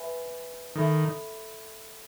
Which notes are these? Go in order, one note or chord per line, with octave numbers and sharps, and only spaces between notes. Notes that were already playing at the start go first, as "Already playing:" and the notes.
Already playing: B4 E5 G#5 B5
D#3 A4 E5 B5